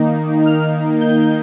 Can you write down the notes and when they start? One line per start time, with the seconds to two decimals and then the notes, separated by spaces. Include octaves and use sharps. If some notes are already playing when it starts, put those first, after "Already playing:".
Already playing: D#3 A#3 D#4
0.46 F6
1.01 G6